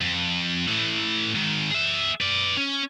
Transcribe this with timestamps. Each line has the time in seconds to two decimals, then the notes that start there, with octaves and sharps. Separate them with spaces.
0.01 F2
0.67 A2 E3
1.34 G#2 D#3
1.71 G#4 E5
2.21 B4 D5
2.57 C#4